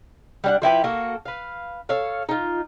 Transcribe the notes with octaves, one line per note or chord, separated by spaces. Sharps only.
G3 D4 F#5
F3 E4 G4 B4
A#3 F#4 A4
B4 F5
A4 C#5 F5
D#4 F4